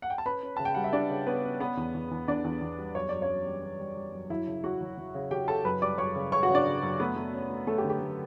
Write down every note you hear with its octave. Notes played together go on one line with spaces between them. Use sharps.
F#5
G5
A5
C#4 B4 B5
C#4
C#3 A5
G5
G3 F#5
E5
G3 D4 D5
C#3
B3 C#4 B4
C#4
B3 B4
E2
E2
E2
E2 D4 D5
E2
E2
G3
F#2 C#5
F#2 D5
C#4 C#5
F#2
G3
C#4
G3
G3
F#2
F#3 E4 E5
C#3
F#3 F#4 F#5
F#3
F#3
C#3
F#3 G4 G5
C#3 A4 A5
F#2 B4 B5
G3 D5 D6
F#2 C#5 C#6
C#3
C#3 C#5 C#6
F#4 F#5
C#3
D4 D5
C#3
F#2
A3 B3 B4
A3
C#4
A3
A3 C#4 A4
G4
D3
G4
A3